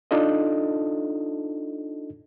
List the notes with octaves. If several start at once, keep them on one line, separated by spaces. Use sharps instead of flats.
D4 D#4 F4 A4 D#5